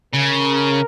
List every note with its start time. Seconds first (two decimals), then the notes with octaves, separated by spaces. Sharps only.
0.14 C#3 A#4